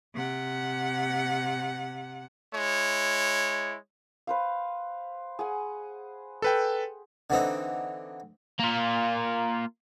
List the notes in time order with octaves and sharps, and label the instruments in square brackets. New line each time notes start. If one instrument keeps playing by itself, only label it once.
[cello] C3 F#5
[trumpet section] G#3 E4 C#5
[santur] B4 C5 F5
G#4 F#5 G#5
[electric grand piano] A4 B4 G5
[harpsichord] D3 E3 C4 D#4
[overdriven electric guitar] A#3 F4